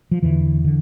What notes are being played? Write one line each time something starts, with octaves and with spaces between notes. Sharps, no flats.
F3
E2 D3 E3
D3